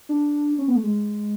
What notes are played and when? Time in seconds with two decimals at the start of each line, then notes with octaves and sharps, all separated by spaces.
0.09 D4
0.58 C#4
0.68 B3
0.75 A3
0.83 G#3